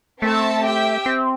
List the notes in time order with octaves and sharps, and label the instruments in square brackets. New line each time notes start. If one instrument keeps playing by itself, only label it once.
[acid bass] A3 [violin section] C4 A4 E5 A5
[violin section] G4 E5 G5
[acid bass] C4